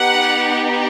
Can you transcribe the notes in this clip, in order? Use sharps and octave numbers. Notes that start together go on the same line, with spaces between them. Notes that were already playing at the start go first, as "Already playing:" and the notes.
Already playing: B3 D#4 G4 F#5